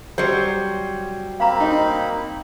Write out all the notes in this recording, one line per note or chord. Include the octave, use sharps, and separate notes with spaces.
F#3 G3 C5
A#3 C4 F5 A#5 B5
D#4